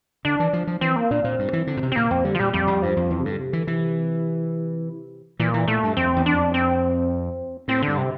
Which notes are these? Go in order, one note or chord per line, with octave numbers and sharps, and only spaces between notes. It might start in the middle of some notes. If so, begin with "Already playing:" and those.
D3 D4
E3
F3
F3
E3 C4
A#3
A#2 D4
A#2 C4
G2
E3
D3
A#2
C3
C4
A#2 A#3
F2 C4
D3 G3
F3
A#2 G3
F2 G3
F2
G2 F3
F2
F2 E3
C3
G2 D3
C3
D3 E3
C3 E3
A#2 E3
E3
A#2 A3
G2
F2 C4
E2
D4
F2
C4
A2 C4
D3
G2
C3